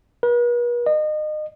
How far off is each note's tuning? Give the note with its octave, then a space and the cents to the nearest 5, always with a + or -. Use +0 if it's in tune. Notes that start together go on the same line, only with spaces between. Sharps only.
B4 -45
D#5 -30